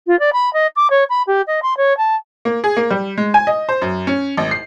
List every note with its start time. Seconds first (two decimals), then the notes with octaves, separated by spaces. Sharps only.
0.06 F4
0.19 D5
0.32 B5
0.53 D#5
0.76 D6
0.90 C#5
1.09 B5
1.27 G4
1.47 D#5
1.62 C6
1.77 C#5
1.97 A5
2.45 A#3
2.64 G#4
2.77 A#3
2.90 G3
3.17 G#3
3.34 G#5
3.47 D#5
3.69 C5
3.82 F#2
4.07 C#4
4.37 G#1
4.51 C7